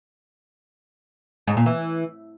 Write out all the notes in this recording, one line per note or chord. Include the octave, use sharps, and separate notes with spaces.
G#2
A#2
E3